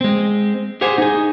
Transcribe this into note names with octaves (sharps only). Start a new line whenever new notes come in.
G#3 C4
G4 G#4 C5 F#5 G#5
D#4 G#4